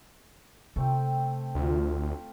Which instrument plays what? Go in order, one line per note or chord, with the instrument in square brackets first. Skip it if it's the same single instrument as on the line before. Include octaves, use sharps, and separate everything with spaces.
[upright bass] C3 [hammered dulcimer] A3 C4 G5
[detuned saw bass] D2 [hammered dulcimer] F4 E5